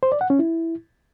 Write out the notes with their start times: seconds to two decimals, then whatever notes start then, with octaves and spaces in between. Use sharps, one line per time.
0.03 C5
0.12 D5
0.21 F#5
0.30 C#4
0.39 E4